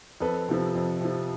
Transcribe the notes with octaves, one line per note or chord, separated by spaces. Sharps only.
F2 A4 B4
C3 F3
F2
C3 F3